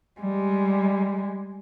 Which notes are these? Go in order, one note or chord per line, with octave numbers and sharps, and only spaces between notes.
G3 G#3